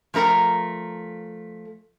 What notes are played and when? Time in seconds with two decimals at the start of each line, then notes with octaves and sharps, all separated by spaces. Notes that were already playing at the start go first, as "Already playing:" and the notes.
0.14 F3 A3 A#4 A#5